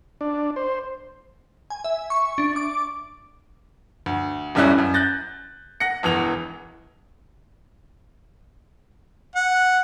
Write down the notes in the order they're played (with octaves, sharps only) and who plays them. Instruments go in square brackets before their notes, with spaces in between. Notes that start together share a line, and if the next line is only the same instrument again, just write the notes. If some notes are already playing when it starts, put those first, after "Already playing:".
[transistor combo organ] D4
C5
[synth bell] G#5
E5
C#6
D4
D6
[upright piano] D2
D#1 C#2 G3 C#4 E4 F#6
F#2
F#6 G6 A6 A#6
F#5 A#6 C#7
E1 E2 E3 F7
[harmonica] F#5